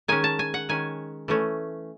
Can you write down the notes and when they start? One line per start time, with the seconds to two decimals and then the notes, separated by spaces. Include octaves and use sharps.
0.08 D#3 G#3 C#4 G#5
0.24 A5
0.39 G#5
0.54 F#5
0.69 D#3 G#3 C#4 G#5
1.28 E3 A3 C#4